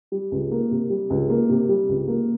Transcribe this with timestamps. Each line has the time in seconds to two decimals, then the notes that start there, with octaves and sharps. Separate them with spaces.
0.12 G3
0.32 C#2
0.51 A#3
0.71 C3
0.90 G3
1.10 C#2
1.30 A#3
1.49 C3
1.69 G3
1.89 C#2
2.08 A#3